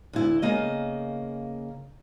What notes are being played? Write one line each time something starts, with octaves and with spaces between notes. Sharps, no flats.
D2 E4
C#3 A#3 D#5